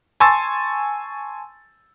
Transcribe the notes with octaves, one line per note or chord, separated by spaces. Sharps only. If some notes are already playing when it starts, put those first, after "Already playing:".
G#5 A5 C6 C#6 E6 A6